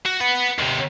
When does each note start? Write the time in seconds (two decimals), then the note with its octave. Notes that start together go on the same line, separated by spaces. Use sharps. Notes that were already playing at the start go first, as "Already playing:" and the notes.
0.05 F#4
0.20 B4 F#5
0.59 D#2 C3